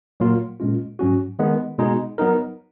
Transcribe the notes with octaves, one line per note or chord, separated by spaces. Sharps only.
A#2 F#3 A#3 F4
A#2 G#3 C#4 F4
G#2 F#3 C#4 F#4
D#3 G#3 B3
B2 G#3 D#4 G#4
F#3 B3 D#4 A#4